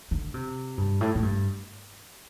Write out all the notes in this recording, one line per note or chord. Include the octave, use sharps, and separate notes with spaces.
D3
C3
G2
A2
A2
G2